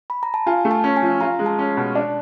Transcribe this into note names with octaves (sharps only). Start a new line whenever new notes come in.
B5
A#5
A5
F4 G#5
A3
A5
C#4
G#5
F3
F4 A#5
G#3
A5
C#4
B2
D4 A5